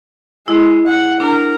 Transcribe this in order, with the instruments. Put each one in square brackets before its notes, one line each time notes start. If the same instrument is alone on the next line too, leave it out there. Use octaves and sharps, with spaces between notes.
[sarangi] G#3 [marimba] E4
[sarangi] F#5
[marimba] D4 [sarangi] A#4